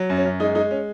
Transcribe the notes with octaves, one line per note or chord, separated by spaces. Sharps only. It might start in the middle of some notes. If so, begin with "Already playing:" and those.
Already playing: F#3
F#2
C#4
F#2
G#3 D#4
G#3 D#4
C#4